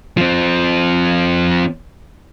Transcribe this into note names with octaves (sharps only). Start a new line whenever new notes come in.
F3 C4